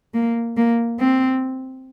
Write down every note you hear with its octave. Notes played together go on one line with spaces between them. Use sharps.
A#3
A#3
C4